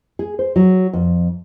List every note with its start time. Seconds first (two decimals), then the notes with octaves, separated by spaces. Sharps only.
0.19 G#4
0.39 C5
0.56 F#3
0.93 F2